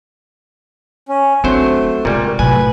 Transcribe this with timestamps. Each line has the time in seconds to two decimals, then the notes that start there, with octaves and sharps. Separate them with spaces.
1.09 C#4
1.44 F#3 A3 C4 D4 C5
2.05 A#2 C#3 G3 G#3
2.39 A#1 A2 C3 F#3 B4 G#5